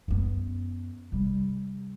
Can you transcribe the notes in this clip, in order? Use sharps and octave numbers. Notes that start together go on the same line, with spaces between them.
F#2 B3
C3 G3